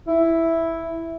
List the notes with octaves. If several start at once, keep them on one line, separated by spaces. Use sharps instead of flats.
E4